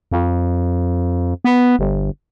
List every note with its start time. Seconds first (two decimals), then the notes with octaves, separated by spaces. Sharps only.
0.12 F2
1.44 B3
1.79 G1